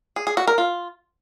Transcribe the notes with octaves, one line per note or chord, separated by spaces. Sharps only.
G#4
G#4
F#4
A#4
F4